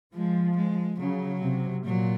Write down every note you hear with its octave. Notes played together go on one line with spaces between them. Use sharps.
F3 G#3
G#3
C#3 F#3
C3
A#2 F#3